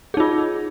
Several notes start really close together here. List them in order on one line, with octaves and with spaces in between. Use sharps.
G#4 D#4 F4